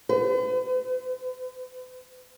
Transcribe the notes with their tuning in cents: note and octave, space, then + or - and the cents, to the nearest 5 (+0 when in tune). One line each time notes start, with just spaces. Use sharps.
B4 +45